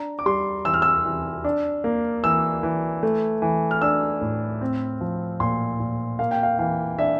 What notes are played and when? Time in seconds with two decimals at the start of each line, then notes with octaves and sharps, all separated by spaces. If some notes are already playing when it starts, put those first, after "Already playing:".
Already playing: D4 A#5
0.19 D6
0.26 G3 C6
0.65 E3 E6
0.74 F6
0.82 E6
1.05 E3
1.44 D4
1.84 A#3
2.24 E3 E6
2.63 E3
3.03 A3
3.42 E3
3.71 F6
3.82 D4 E6
4.21 A2
4.61 C4
5.01 F3
5.40 A#2 C6
5.80 A#2
6.19 A#3 F5
6.31 G5
6.43 F5
6.59 E3 F5
6.99 D4 E5